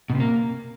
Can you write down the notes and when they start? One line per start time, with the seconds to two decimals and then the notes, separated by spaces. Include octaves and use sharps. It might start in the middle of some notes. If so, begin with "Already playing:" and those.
0.10 B2
0.15 C3
0.20 A#3